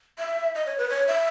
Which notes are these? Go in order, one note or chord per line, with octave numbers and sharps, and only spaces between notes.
E5
D#5
C#5
B4
C#5
E5